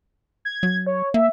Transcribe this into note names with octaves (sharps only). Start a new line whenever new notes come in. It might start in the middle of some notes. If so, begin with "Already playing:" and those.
G#6
F#3
C#5
A#3 E5